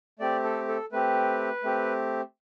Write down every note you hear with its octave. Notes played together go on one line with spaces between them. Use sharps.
A3 C4 G4 D5
A4
A4
A3 C4 G4 B4
A3 C4 G4